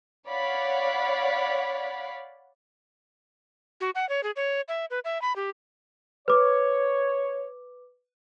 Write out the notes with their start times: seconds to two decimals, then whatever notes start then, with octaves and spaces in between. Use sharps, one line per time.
0.28 C#5 D5 F5 F#5 B5
3.81 F#4
3.95 F#5
4.09 C#5
4.23 G#4
4.36 C#5
4.68 E5
4.90 B4
5.05 E5
5.22 B5
5.36 G4
6.28 B4 C#5 D6